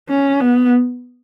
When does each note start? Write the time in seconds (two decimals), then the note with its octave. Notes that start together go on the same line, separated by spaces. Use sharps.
0.09 C#4
0.40 B3